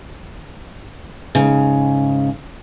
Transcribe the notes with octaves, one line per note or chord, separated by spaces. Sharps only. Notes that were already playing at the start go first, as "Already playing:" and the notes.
G#2 C#3